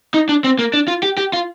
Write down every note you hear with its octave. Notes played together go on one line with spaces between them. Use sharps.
D#4
D4
C4
A#3
D4
F4
G4
G4
F4